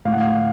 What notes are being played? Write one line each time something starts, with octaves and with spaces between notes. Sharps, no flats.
A2 F5
F#5
F5